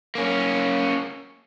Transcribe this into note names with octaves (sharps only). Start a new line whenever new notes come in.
A#3 C#4